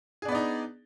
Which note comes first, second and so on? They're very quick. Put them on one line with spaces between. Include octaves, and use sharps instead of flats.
G#4 D4 B3 D5 D#4